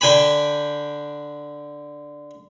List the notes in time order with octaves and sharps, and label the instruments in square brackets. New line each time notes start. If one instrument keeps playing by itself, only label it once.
[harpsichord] D3 G5 G#5 B5